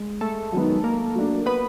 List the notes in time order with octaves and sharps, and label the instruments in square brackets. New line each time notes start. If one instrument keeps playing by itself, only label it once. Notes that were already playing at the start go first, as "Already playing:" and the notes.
Already playing: [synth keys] G#3
A3 A4
[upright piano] F#2 D#3 G#3 B3 D#4
[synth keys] A#3 A#4
[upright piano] F#3 A3 D4
[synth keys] B3 B4